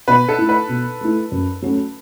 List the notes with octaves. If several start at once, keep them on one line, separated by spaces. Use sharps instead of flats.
B2 B4
A4
A3 E4
B4
B2
A3 E4
F#2
F#3 A3 C#4 F#4